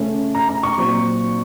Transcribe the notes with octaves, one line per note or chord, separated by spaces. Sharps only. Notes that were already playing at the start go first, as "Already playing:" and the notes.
Already playing: C#3 A3 C#4
A#5
A#5
C#6
A#2 F#3 C4 D#4